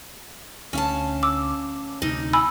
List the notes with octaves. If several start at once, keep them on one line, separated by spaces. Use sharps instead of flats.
D2 C#4 F5 A5
D6 E6
D2 C3 D#4
G#5 B5 E6